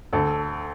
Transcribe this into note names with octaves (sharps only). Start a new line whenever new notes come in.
D2 A4